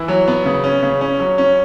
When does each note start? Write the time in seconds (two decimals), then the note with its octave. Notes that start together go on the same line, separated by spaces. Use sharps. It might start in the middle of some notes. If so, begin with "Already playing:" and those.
Already playing: E3 E4
0.08 F#3
0.28 B3
0.45 C#3
0.64 C#4
0.82 C#3
1.01 C#4
1.20 F#3
1.38 C#4